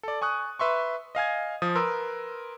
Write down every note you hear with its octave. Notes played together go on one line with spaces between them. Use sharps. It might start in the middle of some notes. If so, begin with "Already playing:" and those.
A4 D5
G#5 C#6 D#6 F#6
B4 E5 C6 C#6
D#5 F5 G#5 G#6
F3 D#6
A#4 B4 C6 E6